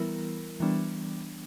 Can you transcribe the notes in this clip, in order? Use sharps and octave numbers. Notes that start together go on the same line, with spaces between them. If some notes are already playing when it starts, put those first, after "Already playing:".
Already playing: E3 G3 B3 E4 A#4
E3 G3 B3 D4